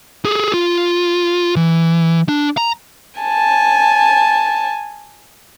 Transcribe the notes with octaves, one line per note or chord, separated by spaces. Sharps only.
G#4 A4
F4
E3
D4
A#5
G#5 A5